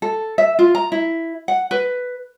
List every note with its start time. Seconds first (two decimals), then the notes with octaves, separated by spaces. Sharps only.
0.02 A4
0.38 E5
0.59 F4
0.75 A#5
0.92 E4
1.48 F#5
1.71 B4